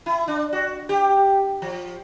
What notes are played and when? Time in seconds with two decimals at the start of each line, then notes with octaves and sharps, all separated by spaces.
0.06 E4
0.28 D4
0.53 F#4
0.89 G4
1.62 F3